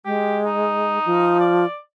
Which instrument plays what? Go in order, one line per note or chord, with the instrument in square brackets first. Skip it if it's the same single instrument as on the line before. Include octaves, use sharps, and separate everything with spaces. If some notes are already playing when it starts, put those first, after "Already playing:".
[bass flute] G#3 [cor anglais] G4
[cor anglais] D#4
[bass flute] F3
[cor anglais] D5